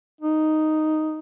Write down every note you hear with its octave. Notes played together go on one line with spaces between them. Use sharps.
D#4